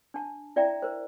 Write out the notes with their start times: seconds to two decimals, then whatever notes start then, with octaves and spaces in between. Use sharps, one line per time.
0.14 D4 A5
0.56 E4 D5 E5 G5 A#5
0.82 A#4 C5